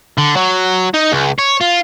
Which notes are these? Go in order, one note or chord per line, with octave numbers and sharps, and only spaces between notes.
D3
F#3
D#4
C#2
C#5
F4